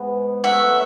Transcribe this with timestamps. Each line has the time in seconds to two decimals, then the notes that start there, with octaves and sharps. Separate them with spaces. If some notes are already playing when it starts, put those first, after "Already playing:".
Already playing: G#2 E3 G#3 B3
0.44 B2 F#3 A3 C#4 E5 F#5